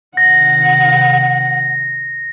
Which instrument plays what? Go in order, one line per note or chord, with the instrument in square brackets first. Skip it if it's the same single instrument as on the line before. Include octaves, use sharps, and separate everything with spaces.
[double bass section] C3 D#3 [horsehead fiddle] F#5 [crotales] A#6